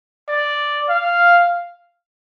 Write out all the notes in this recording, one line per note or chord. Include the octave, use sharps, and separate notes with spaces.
D5
F5